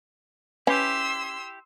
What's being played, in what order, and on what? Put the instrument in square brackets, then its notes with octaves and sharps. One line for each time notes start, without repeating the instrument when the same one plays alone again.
[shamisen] C#4 B4 [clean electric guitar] E4 G4 [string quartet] C6 E6